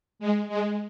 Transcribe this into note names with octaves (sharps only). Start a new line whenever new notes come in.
G#3
G#3